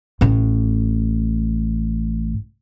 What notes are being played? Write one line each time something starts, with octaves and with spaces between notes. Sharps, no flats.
A1 A2